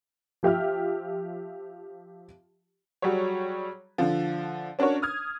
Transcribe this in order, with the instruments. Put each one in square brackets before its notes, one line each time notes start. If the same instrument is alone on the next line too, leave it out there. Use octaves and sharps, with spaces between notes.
[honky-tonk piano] F3 G4 E5 F6
F#3 G3 F#4 G#4 C#5
D3 F3
C#4 D4 F#4 A#4 C#5
D#6 F6 G#6